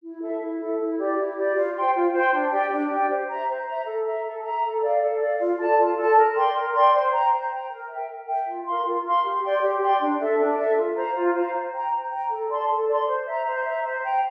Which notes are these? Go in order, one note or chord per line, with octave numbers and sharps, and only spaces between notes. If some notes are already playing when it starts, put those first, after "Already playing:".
E4
A4 E5
E4
A4 E5
E4
G4 D5
E4
G4 D5
F4
C5 G5 C6
F4
C5 G5 C6
D4
G4 D5 G5
D4
G4 D5 G5
C5
E5 A#5
C5
E5 A#5
A4
E5 A#5
A4
E5 A#5
A4
D5 F5
A4
D5 F5
F4
A4 D5 A5
F4
A4 D5 A5
A#4
D5 G5 C6
A#4
D5 G5 C6
C5
G5 A#5
C5
G5 A#5
A#4
E5 G5
A#4
E5 G5
F4
A#4 F5 C6
F4
A#4 F5 C6
G4
D5 G5 C6
G4
D5 G5 C6
D4
A4 E5
D4
A4 E5
F4
C5 F5 A#5
F4
C5 F5 A#5
C5
G5 A#5
C5
G5 A#5
A4
D5 A5 C6
A4
D5 A5 C6
C5
E5 A#5
C5
E5 A#5
C5
G5 A#5